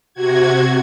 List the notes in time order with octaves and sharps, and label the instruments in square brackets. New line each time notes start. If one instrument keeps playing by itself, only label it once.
[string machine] C3 F#4 G#6